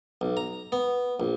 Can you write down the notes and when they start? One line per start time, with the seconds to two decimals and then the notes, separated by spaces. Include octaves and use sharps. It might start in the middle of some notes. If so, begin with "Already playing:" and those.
0.21 B1
0.37 A#5
0.72 B3
1.20 A#1